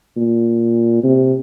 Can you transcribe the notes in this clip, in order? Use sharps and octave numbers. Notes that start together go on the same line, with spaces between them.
A#2
C3